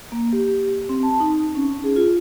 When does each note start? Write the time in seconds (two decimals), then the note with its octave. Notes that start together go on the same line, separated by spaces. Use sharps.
0.12 A#3
0.33 G4
0.89 C4
1.03 A5
1.20 D#4
1.55 C#4
1.84 G#4
1.96 F4